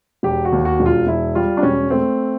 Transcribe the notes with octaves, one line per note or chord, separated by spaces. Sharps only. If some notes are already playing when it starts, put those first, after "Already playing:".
E1 G4
F#4
D#2
F#4
E1
F4
E1 E4
G3 F4
D4
E1 C#4
A3 C4